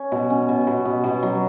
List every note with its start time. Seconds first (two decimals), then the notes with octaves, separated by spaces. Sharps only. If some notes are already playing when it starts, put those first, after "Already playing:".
Already playing: C#4
0.12 B2
0.30 C#4
0.49 B2
0.67 B2
0.85 B2
1.04 B2
1.23 F#3